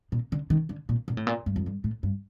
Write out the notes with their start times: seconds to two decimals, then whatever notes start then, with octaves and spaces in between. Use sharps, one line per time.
0.12 A#2
0.32 D3
0.50 D#3
0.69 D3
0.89 A#2
1.08 A#2
1.17 A2
1.27 A#2
1.46 G2
1.56 F2
1.66 G2
1.84 A2
2.03 G2